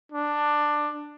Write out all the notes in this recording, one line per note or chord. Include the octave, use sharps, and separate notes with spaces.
D4